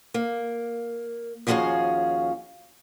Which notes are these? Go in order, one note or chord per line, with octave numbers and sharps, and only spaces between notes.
A#3
D#2 F3 C#4 F#4 G#4 F5